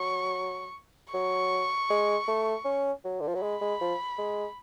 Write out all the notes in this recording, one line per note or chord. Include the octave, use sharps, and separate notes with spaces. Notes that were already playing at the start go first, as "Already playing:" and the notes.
Already playing: F#3 C#6
F#3 C#6
G#3
A3
C#4
F#3
D3
F3
F#3
G#3 B5
G#3
F3
G#3